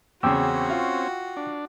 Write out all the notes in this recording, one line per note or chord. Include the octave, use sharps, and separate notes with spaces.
E2 C#3 C4 C#4 F#4 G5 D6 E6
F4
D4